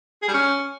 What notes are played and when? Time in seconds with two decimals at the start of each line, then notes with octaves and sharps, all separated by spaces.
0.23 G#4
0.28 G3
0.34 C#4